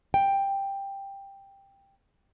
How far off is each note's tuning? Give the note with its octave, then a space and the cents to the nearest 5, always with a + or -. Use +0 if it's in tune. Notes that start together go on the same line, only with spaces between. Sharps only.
G5 +5